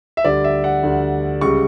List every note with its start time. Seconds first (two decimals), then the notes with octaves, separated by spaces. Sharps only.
0.17 E5
0.24 D2 D3 G3 D5
0.44 E5
0.64 F#5
0.83 D2 D3 G3
1.41 C#2 C#3 G3 C#6